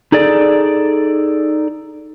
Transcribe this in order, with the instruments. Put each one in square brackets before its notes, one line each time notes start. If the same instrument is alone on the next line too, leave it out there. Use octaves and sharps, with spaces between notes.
[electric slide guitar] D#4 G#4 A4 D5